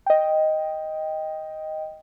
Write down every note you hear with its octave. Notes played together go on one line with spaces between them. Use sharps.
D#5 G5